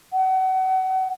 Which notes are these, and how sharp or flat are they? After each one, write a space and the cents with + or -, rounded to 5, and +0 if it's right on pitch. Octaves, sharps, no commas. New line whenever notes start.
F#5 +30